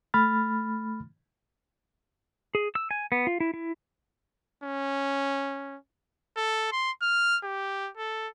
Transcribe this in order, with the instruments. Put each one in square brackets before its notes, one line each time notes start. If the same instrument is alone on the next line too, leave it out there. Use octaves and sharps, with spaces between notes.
[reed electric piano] A3 B5 F6 A6
[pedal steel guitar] G#4
E6
G#5
B3
F4
E4
E4
[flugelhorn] C#4
[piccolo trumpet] A4
C6
F6
G4
A4